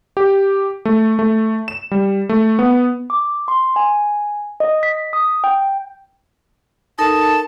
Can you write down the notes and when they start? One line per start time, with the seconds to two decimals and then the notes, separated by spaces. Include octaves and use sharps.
0.17 G4
0.85 A3
1.19 A3
1.68 E7
1.91 G3
2.29 A3
2.59 B3
3.10 D6
3.48 C6
3.76 G#5
4.60 D#5
4.83 B6
5.13 D#6
5.44 G5
6.99 D#4 A4 A#4 A5